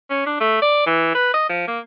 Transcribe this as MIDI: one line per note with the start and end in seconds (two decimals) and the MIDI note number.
0.10 0.23 61
0.27 0.38 62
0.40 0.61 57
0.62 0.84 74
0.86 1.09 52
1.15 1.32 71
1.34 1.48 75
1.49 1.66 53
1.68 1.79 58